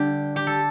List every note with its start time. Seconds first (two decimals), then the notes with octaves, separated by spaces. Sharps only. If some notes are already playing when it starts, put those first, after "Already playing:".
Already playing: D3 G3 G4
0.36 G4
0.47 A4